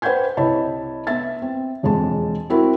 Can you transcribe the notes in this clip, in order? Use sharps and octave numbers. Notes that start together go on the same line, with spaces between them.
B4 C5 F#5 G5 G6 G#6
C2 E4 C#5 D#5 A5 B5
B3 E5 A6
C4
E1 F2 G#3 A5
C4 E4 F#4 A#4